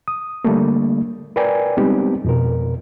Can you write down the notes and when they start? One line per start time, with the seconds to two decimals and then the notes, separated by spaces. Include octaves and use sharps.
0.08 D#6
0.44 D3 G3 A3 A#3
1.36 A#4 B4 D5 G5 G#5
1.77 G3 G#3 B3 C4 D#4 G4
2.25 F2 B2 A#4